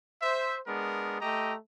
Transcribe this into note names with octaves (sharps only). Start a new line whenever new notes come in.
C5 E5
G#3 B3 D4 A#4
A3 G4 D#5 A#5